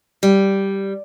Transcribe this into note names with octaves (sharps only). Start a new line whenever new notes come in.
G3